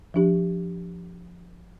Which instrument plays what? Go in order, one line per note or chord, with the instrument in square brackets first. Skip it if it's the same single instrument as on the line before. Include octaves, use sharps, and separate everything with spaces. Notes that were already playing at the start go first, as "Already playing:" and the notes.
[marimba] F3 D4 G4